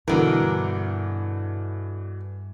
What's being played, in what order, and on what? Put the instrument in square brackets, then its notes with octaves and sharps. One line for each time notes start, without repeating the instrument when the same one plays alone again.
[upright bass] G2 [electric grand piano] B2 E3 [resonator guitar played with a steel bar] D3 A#4